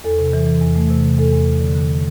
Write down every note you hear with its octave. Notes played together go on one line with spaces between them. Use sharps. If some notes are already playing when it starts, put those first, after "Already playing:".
E2 A4
C3
E3
E3
E2
A3
C3
C3
E2 A4
E2
E2
D3
D3